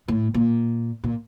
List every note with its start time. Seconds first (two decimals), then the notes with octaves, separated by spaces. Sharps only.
0.08 A2
0.34 A#2
1.04 A#2